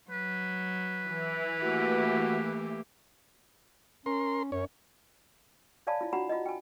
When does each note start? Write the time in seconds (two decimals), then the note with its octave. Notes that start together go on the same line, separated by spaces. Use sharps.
0.11 F#3 B4
1.07 E3
1.63 A3 A#3 F#4 G4
4.06 C#4 A#4 C6
4.52 F#2 C#4 C#5
5.87 C#5 D5 F5 G#5 A5 B5
6.01 E4 F4
6.13 D4 F4 F#4 F#5 A#5 B5
6.29 F4 D#5
6.46 G5 G#5